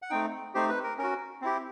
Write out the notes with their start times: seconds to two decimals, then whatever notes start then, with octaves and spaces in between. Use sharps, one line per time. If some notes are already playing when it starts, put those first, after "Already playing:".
0.02 F#5
0.10 A3 C4 D#4 G5
0.55 A3 C4 D#4 G4 C5
0.69 B4
0.83 A#4
0.98 C#4 F#4 A#4
1.41 C4 E4 G4